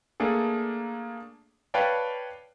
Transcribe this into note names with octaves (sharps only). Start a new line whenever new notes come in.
A3 A#3 D4 G#4 A4
B4 C#5 D5 F5 G5 A5